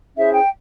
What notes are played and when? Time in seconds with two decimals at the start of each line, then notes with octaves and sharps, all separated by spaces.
0.16 C#4 E4 G#4 C5 E5
0.33 G5